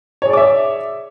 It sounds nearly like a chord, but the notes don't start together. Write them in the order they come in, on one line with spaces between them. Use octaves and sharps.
C#5 G#4 D5 D6 E5